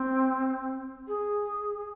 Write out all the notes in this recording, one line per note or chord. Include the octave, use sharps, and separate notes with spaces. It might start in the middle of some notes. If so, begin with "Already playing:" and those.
Already playing: C4
G#4